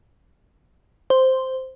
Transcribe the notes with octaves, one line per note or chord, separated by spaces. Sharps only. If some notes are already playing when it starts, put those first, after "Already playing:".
C5